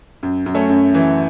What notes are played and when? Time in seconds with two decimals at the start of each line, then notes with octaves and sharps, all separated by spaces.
0.23 F#2
0.46 F#2
0.54 A3 C#4
0.70 F#2
0.94 E3